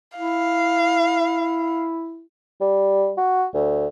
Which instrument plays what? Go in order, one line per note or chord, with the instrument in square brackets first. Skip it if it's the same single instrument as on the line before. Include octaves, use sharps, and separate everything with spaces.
[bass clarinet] E4 [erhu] F5
[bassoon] G3
F#4
D2